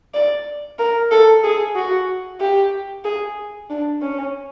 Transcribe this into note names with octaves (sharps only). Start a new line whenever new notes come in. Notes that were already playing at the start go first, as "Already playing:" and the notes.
D5
A#4
A4
G#4
F#4
G4
G#4
D4
C#4